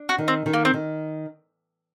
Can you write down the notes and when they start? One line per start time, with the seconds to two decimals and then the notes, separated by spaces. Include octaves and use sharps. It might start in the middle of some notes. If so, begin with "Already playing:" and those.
Already playing: D4
0.09 F#4
0.18 D#3
0.28 C4
0.46 D#3
0.53 A#3
0.65 C4
0.74 D#3